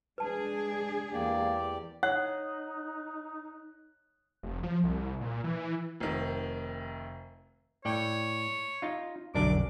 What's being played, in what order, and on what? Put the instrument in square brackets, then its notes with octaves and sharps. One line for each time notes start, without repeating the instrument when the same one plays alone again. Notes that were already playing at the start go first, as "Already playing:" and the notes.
[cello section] G#3 D4 G#4 [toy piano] B4 A5
[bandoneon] E2 G4 D5 [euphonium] A#3
[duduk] D#4 [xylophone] C#5 [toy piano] F#5 [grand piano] F#6
[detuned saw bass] F1
F3
C2
A#2
E3
[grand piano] F1 D#3
[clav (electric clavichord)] A2 D5 G5 [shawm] C#5
[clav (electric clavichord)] D#4 F4
[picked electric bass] F1 B1 D3 [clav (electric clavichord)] F#2 D4 A#4 [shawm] D6